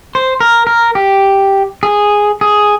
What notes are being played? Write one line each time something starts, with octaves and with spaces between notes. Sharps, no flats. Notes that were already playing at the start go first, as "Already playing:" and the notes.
C5
A#4
A#4
G4
G#4
G#4